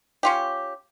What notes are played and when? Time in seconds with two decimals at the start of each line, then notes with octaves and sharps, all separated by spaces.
0.23 C#4 F4 G4